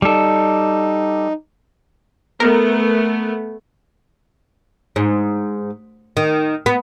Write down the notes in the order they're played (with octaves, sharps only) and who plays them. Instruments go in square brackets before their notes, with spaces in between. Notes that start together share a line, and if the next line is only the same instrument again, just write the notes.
[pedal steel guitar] G3 A4 [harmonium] D#4
[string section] A3 B3 [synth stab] A#4
[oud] G#2
D#3
B3